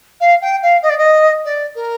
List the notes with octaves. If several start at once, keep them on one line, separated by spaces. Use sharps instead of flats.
F5
G5
F5
D#5
D5
D#5
D5
A#4